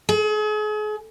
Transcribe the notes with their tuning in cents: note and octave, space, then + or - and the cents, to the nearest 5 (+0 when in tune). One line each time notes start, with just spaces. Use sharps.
G#4 +40